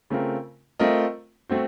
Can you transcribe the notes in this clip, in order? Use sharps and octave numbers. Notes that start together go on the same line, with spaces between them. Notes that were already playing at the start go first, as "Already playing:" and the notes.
C#3 A3 C4 F4 A#4
A3 C4 F4 A#4 D#5
A3 C4 F#4 C5